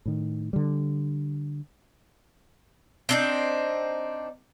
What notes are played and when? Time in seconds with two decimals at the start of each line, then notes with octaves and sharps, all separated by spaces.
0.06 A2 D#3
0.53 D3 G3
3.09 C4 D4 D#4